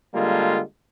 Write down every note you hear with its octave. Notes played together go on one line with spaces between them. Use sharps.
D3 G3 G#3 A#3 F4 A4